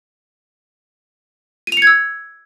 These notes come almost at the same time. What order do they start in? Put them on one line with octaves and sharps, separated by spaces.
D#7 F7 C#7 G#6 E6